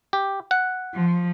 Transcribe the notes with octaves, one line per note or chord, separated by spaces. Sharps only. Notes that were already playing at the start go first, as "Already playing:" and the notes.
G4
F#5
F3